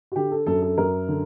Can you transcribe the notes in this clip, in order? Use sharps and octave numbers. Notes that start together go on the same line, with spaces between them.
F#4
D3 G4
A4
F#2 A4
A4
F#2 A#4
D3